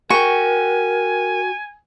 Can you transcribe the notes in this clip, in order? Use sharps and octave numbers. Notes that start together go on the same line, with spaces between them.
F#4 A#4 G5 G#5 C#6